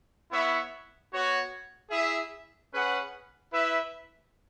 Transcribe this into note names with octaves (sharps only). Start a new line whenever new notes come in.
B3 E4 C#5 E5
B3 F#4 C#5
E4 G#4 E5
C#4 G#4 B4 F#5
E4 B4 E5